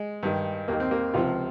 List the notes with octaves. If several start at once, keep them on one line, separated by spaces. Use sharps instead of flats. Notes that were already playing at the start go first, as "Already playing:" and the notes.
Already playing: G#3
G2 D#3
D#2 D#3 A#3
C4
A#3
C#2 C3 F3 F4